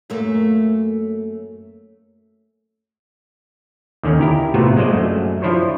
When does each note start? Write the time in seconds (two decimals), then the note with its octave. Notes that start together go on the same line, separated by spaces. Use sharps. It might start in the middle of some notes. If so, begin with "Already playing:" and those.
0.10 F#2 A3 A#3
4.03 D#2 D3 D#3 C#4
4.21 E4 G4 A#4
4.54 A2 C3 A3 B3 F4 F#4
4.76 F#3 G#3 A#3 C5 D5 D#5
4.91 F#2 F#3 A3
5.42 F3 D4 E4 C5 C#5